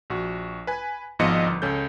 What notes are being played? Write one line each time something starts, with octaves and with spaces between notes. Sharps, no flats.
A#1 F#4
B4 G#5
G#1 G#2 F3 B3 D#5 C#7
G1
C#2 C#4 A4 G6